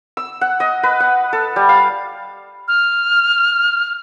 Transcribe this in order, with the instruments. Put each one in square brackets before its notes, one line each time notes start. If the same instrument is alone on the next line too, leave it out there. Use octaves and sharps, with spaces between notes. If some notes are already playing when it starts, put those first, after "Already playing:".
[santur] E6
F#5
D#5
B4
F#5
A4
G3
F5
[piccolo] F6